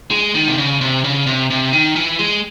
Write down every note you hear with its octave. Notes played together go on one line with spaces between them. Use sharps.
G#3
D#3
C3
C#3
C3
C#3
C3
C3
D#3
E3
G#3